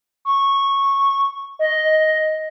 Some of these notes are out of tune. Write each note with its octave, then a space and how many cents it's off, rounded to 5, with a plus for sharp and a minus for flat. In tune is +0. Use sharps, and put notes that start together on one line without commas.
C#6 -10
D#5 +5